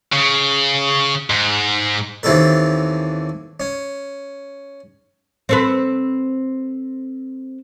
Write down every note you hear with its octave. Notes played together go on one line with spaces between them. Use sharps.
C#3
G#2
D#2 E3 C4 C#4 A4 B4
C#4
C4 A4 B4